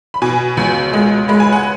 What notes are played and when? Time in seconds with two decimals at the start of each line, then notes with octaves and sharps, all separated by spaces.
0.14 B5
0.22 B2 G#5
0.57 C#2
0.93 G#3
1.28 G#3 B5
1.40 G#5
1.52 F#5